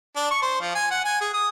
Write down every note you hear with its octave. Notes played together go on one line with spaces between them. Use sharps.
D4
C#6
C5
F3
G#5
F#5
G#5
G#4
D#6